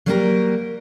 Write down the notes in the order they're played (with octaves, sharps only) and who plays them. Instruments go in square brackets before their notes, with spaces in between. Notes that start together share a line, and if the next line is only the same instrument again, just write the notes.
[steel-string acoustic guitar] F#3 G3 A#3 G4 G#4 A#4